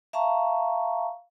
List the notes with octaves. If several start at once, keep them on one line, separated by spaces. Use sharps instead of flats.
E5 F5 A5 A#5 C#6